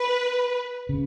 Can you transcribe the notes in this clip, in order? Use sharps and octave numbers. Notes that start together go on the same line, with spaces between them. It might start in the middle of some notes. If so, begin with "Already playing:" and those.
Already playing: B4
C#3